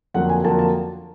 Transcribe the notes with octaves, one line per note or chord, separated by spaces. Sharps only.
F2 D3 F#3 A#3 F#5
G#5
F2 D3 F#3 A#3 A5
A5